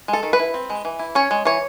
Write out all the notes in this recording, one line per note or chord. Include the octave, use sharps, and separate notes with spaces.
G#3
A4
D#3
B4
E4
C4
G#3
E3
E4
C#4 C#5
G#3
E3 C#5